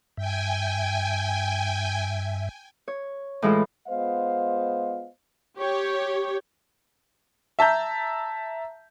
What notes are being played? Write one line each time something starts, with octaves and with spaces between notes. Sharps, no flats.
G2 E5 G5 G#5
C#5
A2 E3 G#3 E4 F4 A4
G#3 B3 F4 C5 D#5 F5
G4 C#5
E5 A5 A#5 G6